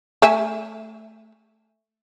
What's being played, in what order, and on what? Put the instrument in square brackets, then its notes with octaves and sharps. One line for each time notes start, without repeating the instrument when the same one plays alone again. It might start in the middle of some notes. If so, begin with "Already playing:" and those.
[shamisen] A3 E5 G#5